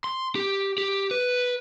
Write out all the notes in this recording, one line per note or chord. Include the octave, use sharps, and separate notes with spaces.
C6
G4
G4
B4